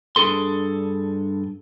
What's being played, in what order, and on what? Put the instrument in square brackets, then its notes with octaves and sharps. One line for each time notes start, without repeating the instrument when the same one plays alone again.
[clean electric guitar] G2 D4 G#4 A4 C6